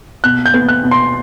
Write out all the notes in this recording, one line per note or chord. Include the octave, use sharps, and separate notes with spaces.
B2 F#6
G6
B3
F#6
B2
C6